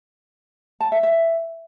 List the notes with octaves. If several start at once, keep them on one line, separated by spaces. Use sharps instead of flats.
A5
E5
E5